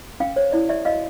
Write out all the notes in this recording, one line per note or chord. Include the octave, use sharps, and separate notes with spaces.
C#4 F5 G5
C5 C#5
E4 D5
G4 D5 E5
F#4 D#5 F5